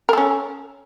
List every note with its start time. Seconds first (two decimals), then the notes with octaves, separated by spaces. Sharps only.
0.09 A#4
0.13 A4
0.18 C#4